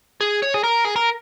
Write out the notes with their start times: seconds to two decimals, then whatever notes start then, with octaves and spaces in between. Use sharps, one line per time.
0.21 G#4
0.42 C#5
0.54 G#4
0.63 A#4
0.85 G#4
0.96 A#4